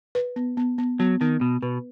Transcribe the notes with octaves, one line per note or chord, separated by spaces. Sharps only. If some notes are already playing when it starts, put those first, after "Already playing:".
B4
B3
B3
B3
F#3 B3
D#3 B3
B2 B3
B2 B4